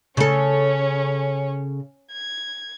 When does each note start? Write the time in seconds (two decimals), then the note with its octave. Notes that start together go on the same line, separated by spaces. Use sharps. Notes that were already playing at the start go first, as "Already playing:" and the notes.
0.17 C#3 C#4 A4 C#5
2.13 G#6